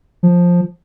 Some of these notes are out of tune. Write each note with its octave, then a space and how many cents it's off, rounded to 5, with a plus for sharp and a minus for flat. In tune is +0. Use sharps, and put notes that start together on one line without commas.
F3 +10